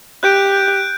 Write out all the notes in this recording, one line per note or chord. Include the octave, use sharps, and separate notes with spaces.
G4 F#6 G6 D7